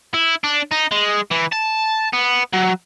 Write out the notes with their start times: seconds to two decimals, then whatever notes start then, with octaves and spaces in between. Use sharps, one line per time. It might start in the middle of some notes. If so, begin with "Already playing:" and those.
0.14 E4
0.44 D4
0.71 D#4
0.92 G#3
1.31 E3
1.52 A5
2.13 B3
2.54 F#3